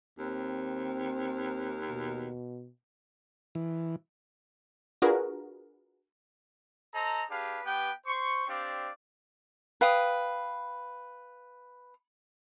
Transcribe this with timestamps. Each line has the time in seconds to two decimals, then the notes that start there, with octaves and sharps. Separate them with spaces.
0.19 D#2 C4
1.90 B2
3.55 E3
5.02 D4 F4 F#4 G#4 A#4 B4
6.94 A4 C5 D#5 A#5
7.29 D4 G4 G#4 B4 F5
7.64 B3 G4 B4 G5
8.06 C5 C6 C#6
8.47 C4 D4 G4 D5 F5
9.81 B4 F5 G5 D#6